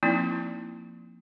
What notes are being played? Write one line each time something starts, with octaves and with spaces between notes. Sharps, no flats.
F3 A#3 C4 D#4 E4